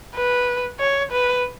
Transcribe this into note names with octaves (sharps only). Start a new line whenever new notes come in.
B4
C#5
B4